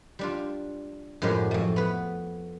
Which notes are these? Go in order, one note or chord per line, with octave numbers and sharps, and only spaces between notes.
G3 D4 F4
F#2 A2 F3 G#3 G4 B4
F2 A3
B3 B4